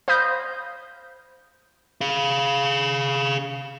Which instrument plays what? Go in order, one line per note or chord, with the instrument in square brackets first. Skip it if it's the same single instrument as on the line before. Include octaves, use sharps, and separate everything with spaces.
[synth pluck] C5 F5 B5 D#6 G6 A#6
[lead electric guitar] G#4 F5